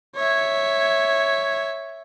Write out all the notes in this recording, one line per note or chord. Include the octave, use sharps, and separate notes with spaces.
C#5 E5